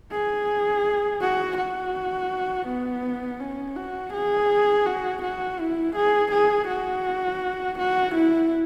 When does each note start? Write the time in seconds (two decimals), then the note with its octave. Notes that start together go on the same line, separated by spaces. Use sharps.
0.12 G#4
1.21 F#4
1.57 F#4
2.68 B3
3.40 C#4
3.76 F#4
4.13 G#4
4.86 F#4
5.23 F#4
5.60 E4
5.96 G#4
6.32 G#4
6.68 F#4
7.79 F#4
8.15 E4